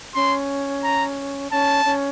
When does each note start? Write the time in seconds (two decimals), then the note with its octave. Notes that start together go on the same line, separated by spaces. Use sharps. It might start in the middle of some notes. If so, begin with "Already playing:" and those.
0.15 C#4 C6
0.83 A#5
1.52 C#4 A5
1.85 C#4